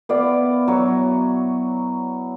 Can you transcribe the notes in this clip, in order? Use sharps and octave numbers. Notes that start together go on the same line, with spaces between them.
B3 E4 D5 F5
F#3 C#5